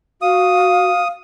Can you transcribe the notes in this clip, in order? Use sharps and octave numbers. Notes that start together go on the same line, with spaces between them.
F#4 F5 D#6